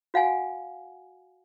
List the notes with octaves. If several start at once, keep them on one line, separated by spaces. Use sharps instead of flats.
F#4 F5 F#5 G#5